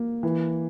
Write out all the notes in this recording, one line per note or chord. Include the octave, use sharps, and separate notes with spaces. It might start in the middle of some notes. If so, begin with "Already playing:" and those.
Already playing: A#3
E3